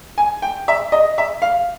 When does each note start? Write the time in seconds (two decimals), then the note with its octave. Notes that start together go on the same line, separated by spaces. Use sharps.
0.18 G#5
0.42 G5
0.68 E5
0.92 D#5
1.18 E5
1.42 F5